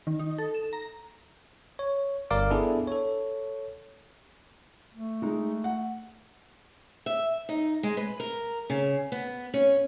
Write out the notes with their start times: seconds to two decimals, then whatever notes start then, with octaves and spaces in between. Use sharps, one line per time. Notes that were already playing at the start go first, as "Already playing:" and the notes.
0.07 D#3
0.19 D#4
0.38 A4
0.55 E7
0.73 A#5
1.79 C#5
2.31 G1 G2 A#4 D5 F5 D6
2.50 B3 D4 E4 G#4 A4
2.87 A4 C#5
4.95 A3
5.22 G#3 D#4
5.64 F#5
7.06 E5
7.49 D#4
7.83 G#3
7.97 B4
8.20 A#4
8.70 C#3
9.12 B3
9.54 C#4